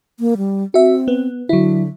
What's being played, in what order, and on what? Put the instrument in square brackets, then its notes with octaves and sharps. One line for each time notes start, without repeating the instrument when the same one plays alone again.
[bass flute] A#3
G3
[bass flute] C4 [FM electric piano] F#4 E5
[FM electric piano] B3
[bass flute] D3 [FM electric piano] F#3 E4